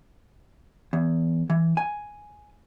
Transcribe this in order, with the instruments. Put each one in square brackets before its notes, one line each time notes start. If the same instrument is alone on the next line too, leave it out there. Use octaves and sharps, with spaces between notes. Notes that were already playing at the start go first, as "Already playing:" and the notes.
[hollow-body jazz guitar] E2
E3
G#5